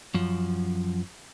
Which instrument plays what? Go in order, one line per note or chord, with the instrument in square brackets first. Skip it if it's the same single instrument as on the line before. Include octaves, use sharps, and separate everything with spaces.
[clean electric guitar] F#2 F3